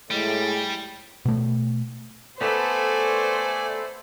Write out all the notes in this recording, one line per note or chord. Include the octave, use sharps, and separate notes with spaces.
A2 G3 G#3
B2 A3
A3 B3 A4 B4 C5 D5 G#5 A5